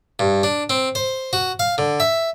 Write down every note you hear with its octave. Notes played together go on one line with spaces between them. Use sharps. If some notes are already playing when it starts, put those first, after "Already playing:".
G2
D4
C4
C5
F#4
F5
D3
E5